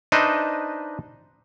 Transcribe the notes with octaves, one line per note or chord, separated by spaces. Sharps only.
D4 D#4 B4 C5 D#5 E5